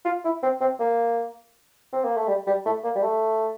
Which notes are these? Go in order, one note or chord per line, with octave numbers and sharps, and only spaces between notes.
F4
E4
C4
C4
A#3
C4
A#3
A3
G3
G3
A3
A#3
G3
A3